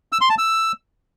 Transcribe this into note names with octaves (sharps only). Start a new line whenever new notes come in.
E6
C6
A5
E6